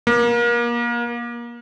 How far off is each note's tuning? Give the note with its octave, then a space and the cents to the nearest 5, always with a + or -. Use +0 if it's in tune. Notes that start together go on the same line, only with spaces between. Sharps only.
A#3 +30